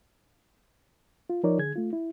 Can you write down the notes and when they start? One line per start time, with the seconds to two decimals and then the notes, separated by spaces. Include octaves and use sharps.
1.30 F4
1.43 F3 D#4 A#4 C#5 D5
1.58 D3 G#4 G#6
1.76 A3 F4
1.93 E4